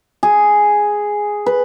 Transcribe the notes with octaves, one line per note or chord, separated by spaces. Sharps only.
G#4
B4